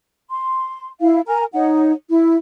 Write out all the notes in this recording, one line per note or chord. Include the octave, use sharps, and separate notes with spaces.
C6
E4 F5
A#4 G#5 A#5
D#4 C#5 F#5
E4